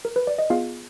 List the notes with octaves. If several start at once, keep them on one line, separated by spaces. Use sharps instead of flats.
A#4
B4
D5
D#5
B3 F4 G#4 F5